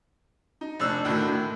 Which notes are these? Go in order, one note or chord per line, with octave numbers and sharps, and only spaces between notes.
D#4
F1 D4 E6 F#6
D2 A2 D3 D#3
A2